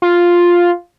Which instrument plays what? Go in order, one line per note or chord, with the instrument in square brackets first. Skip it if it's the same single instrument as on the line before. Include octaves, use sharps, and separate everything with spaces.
[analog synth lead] F4